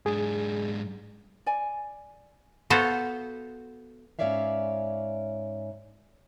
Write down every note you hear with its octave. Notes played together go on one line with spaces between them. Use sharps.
G#2 D4 G#4
D5 G#5
B3 F#4 A4 C5 F5
G#2 C#4 C#5 D5 E5 F5